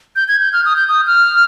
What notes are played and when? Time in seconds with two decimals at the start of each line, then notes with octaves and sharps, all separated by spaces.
0.16 G6
0.28 G#6
0.41 G6
0.53 F6
0.65 D#6
0.76 G6
0.88 D#6
1.07 F6